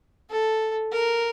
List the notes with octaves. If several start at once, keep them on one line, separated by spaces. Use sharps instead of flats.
A4
A#4